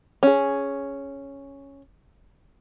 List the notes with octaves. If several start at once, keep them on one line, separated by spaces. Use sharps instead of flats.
C#4 G#4